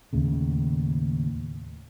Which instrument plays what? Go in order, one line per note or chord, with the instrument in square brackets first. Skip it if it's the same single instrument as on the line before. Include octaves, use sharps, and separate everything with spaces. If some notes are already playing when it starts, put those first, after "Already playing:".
[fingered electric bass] D#2 A2 C#3